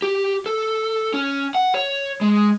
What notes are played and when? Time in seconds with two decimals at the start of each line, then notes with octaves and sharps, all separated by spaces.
0.02 G4
0.46 A4
1.14 C#4
1.55 F#5
1.74 C#5
2.21 G#3